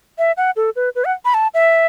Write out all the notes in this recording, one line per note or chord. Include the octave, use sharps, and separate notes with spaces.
E5
F#5
A4
B4
B4
F#5
B5
A5
E5